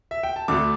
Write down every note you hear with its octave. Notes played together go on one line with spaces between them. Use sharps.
E5
G5
A5
D2 D3 A3 D6